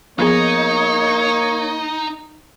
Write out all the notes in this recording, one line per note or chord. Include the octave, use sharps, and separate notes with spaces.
F3 A#3 B3 D#4 G#4 C#5